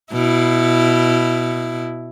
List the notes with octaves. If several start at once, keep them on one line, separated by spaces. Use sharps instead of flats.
B2 E4